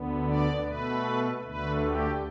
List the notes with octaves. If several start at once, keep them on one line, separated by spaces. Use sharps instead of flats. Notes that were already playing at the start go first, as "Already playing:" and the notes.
Already playing: D2 D3 B3
D5
B2 A3 B4
D2 D3 A3 B4
G4